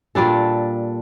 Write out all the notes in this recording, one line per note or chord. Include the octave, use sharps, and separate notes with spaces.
A#2 G3 D4 A4